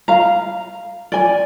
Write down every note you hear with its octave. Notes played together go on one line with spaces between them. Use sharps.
F5 A#5
D5 G#5